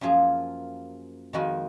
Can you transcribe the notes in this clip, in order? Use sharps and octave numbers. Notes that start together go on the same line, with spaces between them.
F#2 F3 A#3 F4 G#4
F2 D#3 G#3 D#4 F#4